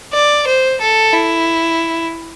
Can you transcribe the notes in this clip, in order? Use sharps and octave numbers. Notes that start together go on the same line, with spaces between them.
D5
C5
A4
E4